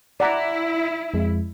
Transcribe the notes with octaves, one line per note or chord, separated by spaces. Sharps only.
E4 D5 F#5 A#5
F2 G#3